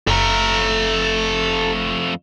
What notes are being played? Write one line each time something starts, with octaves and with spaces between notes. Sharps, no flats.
F#1 F2 A3 A4 A#5